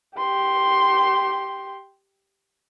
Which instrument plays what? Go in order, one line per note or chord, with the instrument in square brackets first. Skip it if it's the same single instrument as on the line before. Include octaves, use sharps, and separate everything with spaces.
[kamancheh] G4 C6